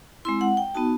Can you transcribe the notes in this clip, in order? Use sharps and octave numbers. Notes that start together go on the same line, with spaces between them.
G#3 C4 E4 C6
F#5
G5
B3 D#4 F#4 A5